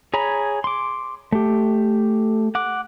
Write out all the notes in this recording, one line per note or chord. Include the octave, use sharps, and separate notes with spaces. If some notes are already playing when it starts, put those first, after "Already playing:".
G#4 C#5 A#5 B5
C6 D6
A3 G4
F#5 D6